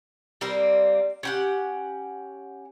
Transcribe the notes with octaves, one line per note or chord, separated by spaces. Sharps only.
G3 A#3 C4
C#4 G4 F#5